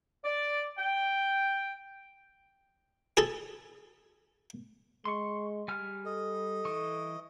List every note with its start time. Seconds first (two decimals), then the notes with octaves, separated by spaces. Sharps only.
0.25 D5
0.79 G5
3.17 G#4 A4 A5
5.05 G#3 C6 C#6
5.68 G3 G#5 F6
6.06 A4 D#5
6.65 E3 C#6